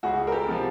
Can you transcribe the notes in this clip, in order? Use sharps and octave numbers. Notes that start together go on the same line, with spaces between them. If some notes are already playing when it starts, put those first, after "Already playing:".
C#2 F#4 G#4
A#4
G4 A4
C3 F3